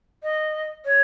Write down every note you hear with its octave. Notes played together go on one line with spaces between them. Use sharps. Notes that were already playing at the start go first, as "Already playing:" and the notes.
D#5
C#5